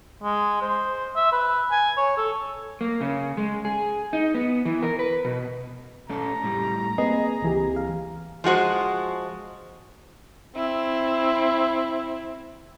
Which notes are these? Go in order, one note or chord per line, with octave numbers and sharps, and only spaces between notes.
G#3
C5
E5
B4
G#5
C#5
A4
A#3
C#3
G#3
G#4
D#4
B3
E3
A#4
B4
B2
A3 C#4 A4 A#5
A2 G3
A#3 C4 G#4 B4 D#5
C#2 E3 G4
F5
F3 G#3 F#4 C5
C4 E4